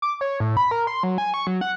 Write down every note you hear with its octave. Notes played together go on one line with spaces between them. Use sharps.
D6
C#5
A2
B5
A#4
C6
F#3
G#5
C#6
F#3
F#5